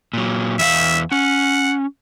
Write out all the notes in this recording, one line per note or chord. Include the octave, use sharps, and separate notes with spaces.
A#2 F#3
E2 E4 E5 F5
C#4 F#5